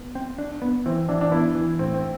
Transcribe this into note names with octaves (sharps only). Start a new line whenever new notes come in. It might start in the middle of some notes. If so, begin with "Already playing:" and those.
Already playing: B3
C4
D4
B3
E3 C4
E3 D4
D4
B3 E4
E3
A2 C4
C4